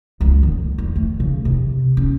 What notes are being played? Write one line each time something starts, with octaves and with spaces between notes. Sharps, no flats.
C#2
D3
E2
A3
C#3
C3
C#4